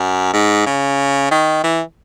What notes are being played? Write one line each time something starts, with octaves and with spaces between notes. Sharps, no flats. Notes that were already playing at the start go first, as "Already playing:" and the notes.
Already playing: F#2
G#2
C#3
D#3
E3